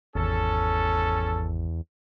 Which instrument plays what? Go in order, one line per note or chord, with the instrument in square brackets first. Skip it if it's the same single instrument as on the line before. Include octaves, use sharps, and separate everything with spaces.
[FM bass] G#1 [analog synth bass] E2 [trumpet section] C#4 A4